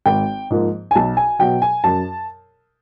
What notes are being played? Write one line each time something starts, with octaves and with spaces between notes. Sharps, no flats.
G#1 G5
G#2 F3 A#3
G#5
B1 A5
G#5
B2 F#3 G5
G#5
F#2 A5